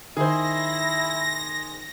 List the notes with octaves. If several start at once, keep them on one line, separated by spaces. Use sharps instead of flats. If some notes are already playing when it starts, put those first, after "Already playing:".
D#3 E4 G#4 C5 A#6